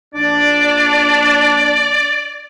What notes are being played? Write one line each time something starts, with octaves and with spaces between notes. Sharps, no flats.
A#1 D4 D5